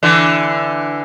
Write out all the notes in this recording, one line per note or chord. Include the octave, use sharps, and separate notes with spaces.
D3 E3